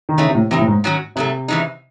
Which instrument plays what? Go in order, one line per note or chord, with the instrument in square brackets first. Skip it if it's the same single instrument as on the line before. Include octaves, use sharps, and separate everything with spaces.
[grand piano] D#3
[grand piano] C#3 [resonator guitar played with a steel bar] E3 A3 D#4
[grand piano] C3
A2
[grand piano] C3 [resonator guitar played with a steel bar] E3 C4 D#4
[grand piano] A2
G#2
[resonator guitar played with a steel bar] D#3 F#3 C#4 F#4
[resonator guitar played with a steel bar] G#2 F#3 A3 [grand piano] C3
[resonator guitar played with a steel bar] E2 C#3 E3 G#3 D#4